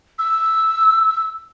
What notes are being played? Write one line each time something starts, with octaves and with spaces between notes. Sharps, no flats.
E6